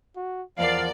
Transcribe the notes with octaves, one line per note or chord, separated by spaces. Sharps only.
F#4
E2 F3 A#4 D5 F5 F#5